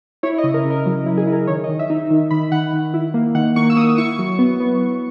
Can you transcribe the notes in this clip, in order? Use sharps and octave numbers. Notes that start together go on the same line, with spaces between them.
E4 C#5
D#5
C#3
A#4
C#3
A#4
F#3
E4
G#4
E4
A#4
D#3 C#5
D#5
D#3
E5
D#4
D#3
D#3 B5
D#3 F#5
D#3
E4
A#3
D#3 F#5
A#3 C#6
E6
A#3 D#6
E4 C#6
F#3
B3
B3
B3